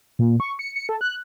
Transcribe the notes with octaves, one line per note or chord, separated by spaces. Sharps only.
A#2
C#6
C#7
C#7
A4
F#6